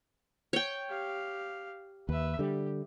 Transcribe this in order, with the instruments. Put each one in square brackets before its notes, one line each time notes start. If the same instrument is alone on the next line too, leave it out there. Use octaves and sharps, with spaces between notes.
[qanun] C#5 G5
[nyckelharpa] G4 F5
[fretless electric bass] D#2 [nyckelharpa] B4 E5
[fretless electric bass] D3 G3 [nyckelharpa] G4